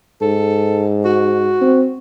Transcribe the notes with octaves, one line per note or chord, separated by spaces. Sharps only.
G#2 A4
F#4
C4